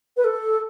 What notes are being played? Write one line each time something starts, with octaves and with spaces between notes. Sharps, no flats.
B4
A4